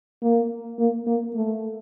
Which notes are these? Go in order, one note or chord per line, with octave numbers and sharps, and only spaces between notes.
A#3
A#3
A#3
A3